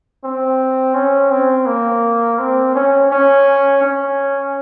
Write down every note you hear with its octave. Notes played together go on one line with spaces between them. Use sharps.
C4
C#4
C4
A#3
C4
C#4
C#4
C#4